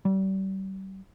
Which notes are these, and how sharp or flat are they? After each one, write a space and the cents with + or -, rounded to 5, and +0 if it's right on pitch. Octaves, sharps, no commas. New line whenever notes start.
G3 -35